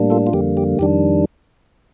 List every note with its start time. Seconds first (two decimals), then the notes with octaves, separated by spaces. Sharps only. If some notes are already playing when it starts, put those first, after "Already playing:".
Already playing: A2 G3 A#3 D4
0.10 F4 A4
0.27 F4
0.33 F2 D3 G3 A#3 G4
0.57 G4
0.79 F2 D#3 G3 D4 G4